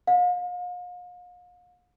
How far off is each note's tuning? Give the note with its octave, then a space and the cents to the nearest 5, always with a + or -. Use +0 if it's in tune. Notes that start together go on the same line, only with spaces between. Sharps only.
F5 +40